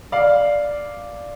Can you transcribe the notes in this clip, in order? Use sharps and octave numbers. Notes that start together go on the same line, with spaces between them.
D5 F5